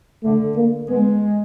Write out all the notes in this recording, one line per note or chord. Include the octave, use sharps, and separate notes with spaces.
D3 A3
A#3
G#3 B3